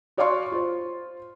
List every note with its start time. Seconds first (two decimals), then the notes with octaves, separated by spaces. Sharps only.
0.17 F#4 C#5 D5 F5 C6 C#6
0.52 F4 C5